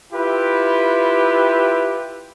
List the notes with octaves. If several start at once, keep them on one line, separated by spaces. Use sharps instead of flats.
E4 F4 G4 B4